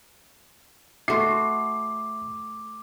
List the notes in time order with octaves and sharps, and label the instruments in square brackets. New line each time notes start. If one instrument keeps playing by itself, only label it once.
[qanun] A3 F#4 [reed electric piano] E5 C6 [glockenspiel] D6 [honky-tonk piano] C7